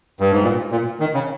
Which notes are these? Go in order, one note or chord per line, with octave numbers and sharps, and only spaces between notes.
G2
G#2
A#2
A#2
D#3
C#3